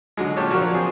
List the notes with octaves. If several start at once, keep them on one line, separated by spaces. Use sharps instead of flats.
D3 F#3 G#3
A#2 F4 G4 C#5 A5
F3 F#3 D4 F#4 A#4 C#5
C4 G#4